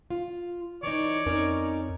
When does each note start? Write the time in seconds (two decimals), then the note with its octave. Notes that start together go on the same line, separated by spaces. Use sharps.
0.10 F4
0.83 E3 D#4 C#5 D5
1.26 F2 C#4 D#4 A#4